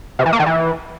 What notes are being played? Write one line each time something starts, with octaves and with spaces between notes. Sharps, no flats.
C3
E3
A#3
D#3
E3